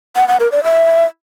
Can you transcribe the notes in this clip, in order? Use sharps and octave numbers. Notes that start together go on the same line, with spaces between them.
F#5
F#5
A#4
D5
E5